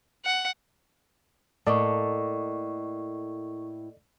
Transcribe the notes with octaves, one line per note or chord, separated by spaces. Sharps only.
F#5
A2 A#3 E4 A4 D5 D#5 C#6